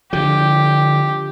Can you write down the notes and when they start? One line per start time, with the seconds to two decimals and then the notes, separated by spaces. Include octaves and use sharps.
0.13 D3 F3 G4